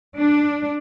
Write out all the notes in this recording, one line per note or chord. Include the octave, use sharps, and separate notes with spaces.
D4